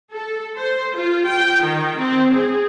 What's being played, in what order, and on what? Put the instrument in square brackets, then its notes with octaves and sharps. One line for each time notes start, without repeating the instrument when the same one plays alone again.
[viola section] A4
C5
F4
G5
D#3
C4
G#4